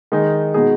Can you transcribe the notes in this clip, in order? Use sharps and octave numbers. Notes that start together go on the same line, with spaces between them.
D#3 G#3 D#4
B2 G#3 D#4 G#4